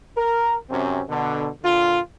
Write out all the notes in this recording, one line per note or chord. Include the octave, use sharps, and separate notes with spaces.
A#4
F#2 C3 C4 C#4
B2 D3
A#2 D3 F4